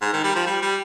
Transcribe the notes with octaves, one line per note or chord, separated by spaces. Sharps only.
G#2
D#3
G3
F3
G3
G3